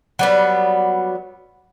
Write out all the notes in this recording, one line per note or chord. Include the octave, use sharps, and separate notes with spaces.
F#3 G3 B3